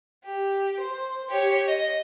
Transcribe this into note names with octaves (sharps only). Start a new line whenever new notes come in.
G4
C5
G4 C#5
D#5